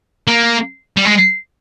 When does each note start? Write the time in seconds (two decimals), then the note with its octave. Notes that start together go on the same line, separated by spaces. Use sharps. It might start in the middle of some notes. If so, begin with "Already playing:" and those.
0.27 A#3
0.97 G3
1.05 G#3